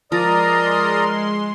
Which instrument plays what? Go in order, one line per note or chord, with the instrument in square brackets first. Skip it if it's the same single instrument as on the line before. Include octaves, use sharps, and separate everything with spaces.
[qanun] F3 [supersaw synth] G#3 C6 [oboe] A#4 [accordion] D5 A#5 D#6